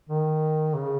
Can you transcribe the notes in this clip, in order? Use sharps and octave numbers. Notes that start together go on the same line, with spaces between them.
D#3
C#3